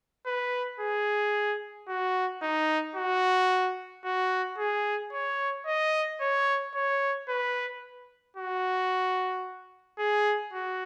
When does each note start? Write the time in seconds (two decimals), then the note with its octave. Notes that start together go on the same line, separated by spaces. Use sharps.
0.26 B4
0.80 G#4
1.88 F#4
2.42 D#4
2.96 F#4
4.05 F#4
4.58 G#4
5.12 C#5
5.66 D#5
6.20 C#5
6.75 C#5
7.28 B4
8.37 F#4
9.99 G#4
10.53 F#4